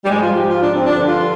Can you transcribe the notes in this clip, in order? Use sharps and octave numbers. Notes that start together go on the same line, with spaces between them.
G3
G#2 F3 G#3
F4
G4
F4
D4
C4
G2 D3 F3 D4
F4